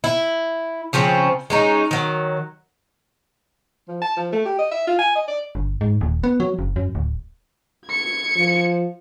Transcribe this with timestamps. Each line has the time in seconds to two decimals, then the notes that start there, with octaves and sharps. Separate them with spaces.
0.04 E4
0.93 C#3 F3 C4 C#4
1.50 G#3 C#4 D#4
1.91 D#3 F#3
3.88 F3
4.02 A5
4.17 F3
4.32 A3
4.45 G4
4.58 D#5
4.71 E5
4.87 F4
4.99 G#5
5.15 D#5
5.28 D5
5.55 G1
5.81 G#2
6.01 D#1
6.24 B3
6.40 F#3
6.59 F#1
6.76 F#2
6.95 D1
7.87 G#6 C#7
8.36 F3